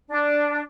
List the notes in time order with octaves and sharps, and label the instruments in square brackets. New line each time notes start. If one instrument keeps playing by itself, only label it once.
[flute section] D4